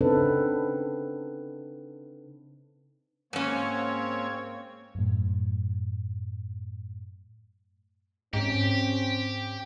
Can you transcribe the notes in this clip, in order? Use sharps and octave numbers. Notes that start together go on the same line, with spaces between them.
C#3 C4 D4 D#4 A4 B4
G#2 A#3 C4 C#4 C#5
F#2 A2
G#2 C4 C#4 G4